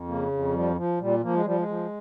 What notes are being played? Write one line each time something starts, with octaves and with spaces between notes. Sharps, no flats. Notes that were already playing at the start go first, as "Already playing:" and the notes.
Already playing: F2
C#3 A#3
F2
F3 G3
F3
A#2 G3
F3 A#3
G#3
F3 G3
G#3
F3